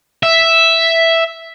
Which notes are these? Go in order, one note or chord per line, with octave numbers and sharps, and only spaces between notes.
E5